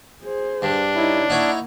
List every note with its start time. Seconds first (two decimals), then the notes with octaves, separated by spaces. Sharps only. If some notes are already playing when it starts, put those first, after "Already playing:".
0.24 G#4 C5
0.62 G2 D4
0.95 D#4 E4 C#5 D#5
1.30 A#3 D#4 E4 C#5 F#5